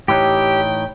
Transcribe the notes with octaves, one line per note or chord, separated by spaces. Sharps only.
A2 E3 D#4 G4 C#5 G5